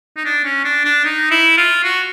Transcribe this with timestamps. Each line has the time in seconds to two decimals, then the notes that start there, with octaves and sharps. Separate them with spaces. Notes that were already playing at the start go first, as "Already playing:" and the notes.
0.17 D#4
0.25 D4
0.45 C#4
0.65 D4
0.85 D4
1.05 D#4
1.31 E4
1.57 F4
1.84 F#4